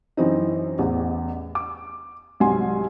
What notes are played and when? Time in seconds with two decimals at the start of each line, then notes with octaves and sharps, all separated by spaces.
0.17 F#2 E3 C4 D#4
0.78 A1 E2
1.55 D6
2.40 C2 G#2 F#3 G#5 C6